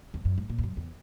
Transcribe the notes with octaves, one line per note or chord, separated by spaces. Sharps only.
E2
F#2
G#2
A#2
E2
F#2
E2